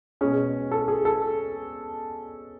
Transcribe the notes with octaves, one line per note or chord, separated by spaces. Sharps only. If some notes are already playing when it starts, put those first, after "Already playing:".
B2 G#3 C#4 G#4
A4
G#4
A4